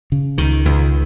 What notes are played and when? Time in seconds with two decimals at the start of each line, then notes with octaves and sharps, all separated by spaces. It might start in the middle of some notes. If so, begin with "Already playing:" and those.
0.12 C#3
0.38 C#2 D#3
0.65 C#2